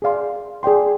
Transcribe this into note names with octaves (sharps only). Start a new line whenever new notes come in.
G#4 D5 F5 C6
G#4 D5 G5 C6